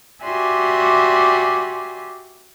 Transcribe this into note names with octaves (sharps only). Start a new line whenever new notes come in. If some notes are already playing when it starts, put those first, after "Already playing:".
F#4 G4 D5 E5 G#5 C6